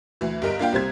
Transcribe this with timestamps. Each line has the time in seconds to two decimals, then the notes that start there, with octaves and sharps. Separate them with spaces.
0.21 D2 E3
0.42 G1 G3 A#4 D#5 B6 D7
0.59 A#3 D4 F4 F5 G5
0.72 C2 G3 C4 C5 G#6